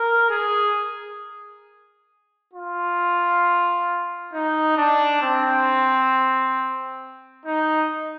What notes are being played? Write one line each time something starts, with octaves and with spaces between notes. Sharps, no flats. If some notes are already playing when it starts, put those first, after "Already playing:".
Already playing: A#4
G#4
F4
D#4
D4
C4
D#4